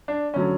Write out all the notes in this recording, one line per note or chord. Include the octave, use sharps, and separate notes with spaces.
D4
D3 F#3 C#4